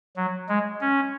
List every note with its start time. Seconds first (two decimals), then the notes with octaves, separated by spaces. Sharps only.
0.16 F#3
0.48 G#3
0.81 C#4